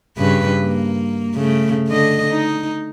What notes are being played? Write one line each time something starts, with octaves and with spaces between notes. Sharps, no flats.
G2 C#3 B4
A#3
C#3 A3
D3 D#5
D#4